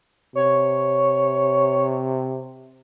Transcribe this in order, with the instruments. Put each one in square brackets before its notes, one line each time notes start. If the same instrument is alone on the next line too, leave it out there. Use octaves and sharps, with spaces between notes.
[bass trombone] C3 [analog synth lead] C#5